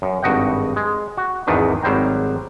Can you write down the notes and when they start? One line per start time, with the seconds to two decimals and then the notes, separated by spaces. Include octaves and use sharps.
0.02 F#2
0.23 G#1 G2 F#4 D#5 F#5 G5
0.76 G#3
1.17 F#4
1.47 G#1 E2 G#2 D#3 D4 B4
1.83 G#1 F#3 G3 C5 G5 A#5